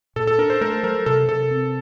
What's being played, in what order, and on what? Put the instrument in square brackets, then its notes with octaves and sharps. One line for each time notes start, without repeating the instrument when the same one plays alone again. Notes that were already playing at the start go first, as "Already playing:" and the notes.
[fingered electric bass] A#2 [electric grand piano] A4
[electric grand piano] A4
[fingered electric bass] D4 [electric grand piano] A#4
[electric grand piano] C5
[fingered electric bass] A3 [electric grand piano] A#4
[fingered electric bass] F#3 [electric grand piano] A#4
[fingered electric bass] C3 [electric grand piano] A4
[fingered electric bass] C3 [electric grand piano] A4
[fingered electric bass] C4